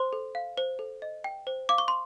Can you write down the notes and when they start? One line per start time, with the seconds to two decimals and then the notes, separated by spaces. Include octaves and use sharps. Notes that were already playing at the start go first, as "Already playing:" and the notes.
Already playing: C5 C6
0.13 A4
0.35 F5
0.57 C5
0.79 A4
1.02 D#5
1.24 G5
1.47 C5
1.69 F5 D6
1.78 C#6
1.88 C6